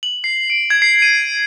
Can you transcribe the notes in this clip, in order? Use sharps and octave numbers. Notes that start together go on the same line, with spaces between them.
F#7
C7
D7
G#6
C7
D#7